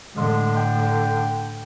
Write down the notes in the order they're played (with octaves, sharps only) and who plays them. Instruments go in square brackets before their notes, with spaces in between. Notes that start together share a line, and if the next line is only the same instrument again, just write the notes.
[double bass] A2 D3 [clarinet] G#3
[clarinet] G5